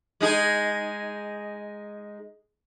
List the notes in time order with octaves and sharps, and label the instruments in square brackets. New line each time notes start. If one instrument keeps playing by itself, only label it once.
[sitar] G#3 D#4 G#4